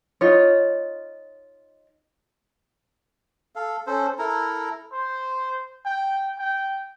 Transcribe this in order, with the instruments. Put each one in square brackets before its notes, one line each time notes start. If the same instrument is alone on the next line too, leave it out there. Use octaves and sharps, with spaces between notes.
[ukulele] D#4 F4 C#5
[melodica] A4 F5
C#4 A4 C5
E4 A4 A#4 A#5
[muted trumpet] C5
G5
G5